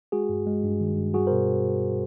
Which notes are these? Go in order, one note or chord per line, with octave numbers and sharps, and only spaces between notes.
G#3 F#4 G#4
G2
G#3
G2
D#3
G2
G3 F#4 G#4
B2 A#4 C5